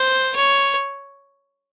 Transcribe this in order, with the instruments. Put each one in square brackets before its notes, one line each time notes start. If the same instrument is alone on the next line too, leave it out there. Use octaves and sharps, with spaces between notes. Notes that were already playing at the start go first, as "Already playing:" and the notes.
Already playing: [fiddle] C5
C#5